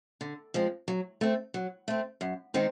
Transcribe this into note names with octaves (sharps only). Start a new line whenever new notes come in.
D3
F3 G#3 C4
F#3
A3 C4
F#3
A3 C4
F#2
D#3 G#3 C4 D#4